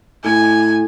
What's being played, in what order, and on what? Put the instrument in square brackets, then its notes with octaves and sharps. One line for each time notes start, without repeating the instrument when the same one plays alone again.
[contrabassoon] A2 [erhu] G#5